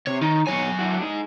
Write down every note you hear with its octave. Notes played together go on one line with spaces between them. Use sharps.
C3 C#5
D#3 D#4
B2 E3 F#3 C#5 G#5
D4 E4 F#4
D#4 G#4